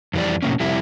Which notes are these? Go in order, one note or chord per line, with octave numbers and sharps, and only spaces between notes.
F2 E3 G3 D5
A2 C3 F#3 A#3 C#4
F2 C3 G3 E4